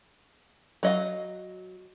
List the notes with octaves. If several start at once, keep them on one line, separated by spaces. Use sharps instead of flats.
F#3 D#5 F5